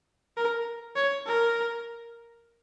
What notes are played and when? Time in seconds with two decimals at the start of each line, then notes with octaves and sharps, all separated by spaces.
0.37 A#4
0.96 C#5
1.26 A#4